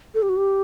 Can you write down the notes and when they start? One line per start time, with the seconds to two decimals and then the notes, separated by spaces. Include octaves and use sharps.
0.14 A4
0.22 G4
0.29 F#4
0.36 G4